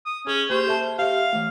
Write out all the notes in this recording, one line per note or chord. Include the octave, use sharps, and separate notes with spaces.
D#6
C#4 G#4
A#3 G4 C5 C#6
A4 E5 A5
G4 E5 F5
E3 A3